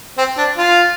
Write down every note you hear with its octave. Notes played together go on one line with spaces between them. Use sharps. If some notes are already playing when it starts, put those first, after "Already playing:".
C4
D4
F4